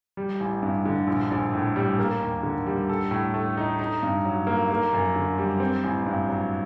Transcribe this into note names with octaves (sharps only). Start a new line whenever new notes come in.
G3
A1
G2
D3
A#1
A#1
A2
G3
A#3
D#2
D3
G3
A4
A2
A3
D#4
D#4
G2
F#3
A#3
A#3
F#2
D3
G3
C4
A1
G2
F#3